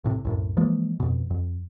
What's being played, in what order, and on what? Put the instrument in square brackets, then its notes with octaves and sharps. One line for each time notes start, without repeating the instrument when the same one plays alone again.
[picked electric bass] C2 A2 C3
C2 F#2 A2
E3 F3 G#3 A#3
F2 B2
F2